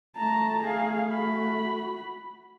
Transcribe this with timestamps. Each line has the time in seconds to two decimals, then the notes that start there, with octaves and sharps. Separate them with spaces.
0.17 A3 A5 A#5
0.63 A3 G#4 F5
1.13 F#4 B5